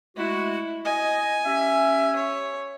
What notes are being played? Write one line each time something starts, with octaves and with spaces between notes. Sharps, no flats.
G#3 A3 E4 F#4
D#5 G#5
C#4 G4 E5
C#5